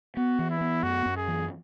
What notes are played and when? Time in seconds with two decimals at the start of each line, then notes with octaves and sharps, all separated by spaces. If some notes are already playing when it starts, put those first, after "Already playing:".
0.17 B3 F#4
0.39 E3
0.51 E4
0.61 B3
0.83 F#2 F#4
1.06 F#2
1.17 G#4
1.28 E3